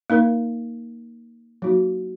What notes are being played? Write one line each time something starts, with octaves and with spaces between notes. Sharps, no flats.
A#3 D#4 A#4
F#3 A#3 D#4 F#4